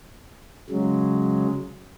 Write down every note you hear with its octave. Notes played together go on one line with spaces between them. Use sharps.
C#3 F#3 G#3